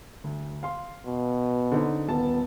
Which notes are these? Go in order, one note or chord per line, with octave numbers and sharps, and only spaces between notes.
D2
F5 C6
B2
D3 C4 D#4
D#1 B3 F4 A5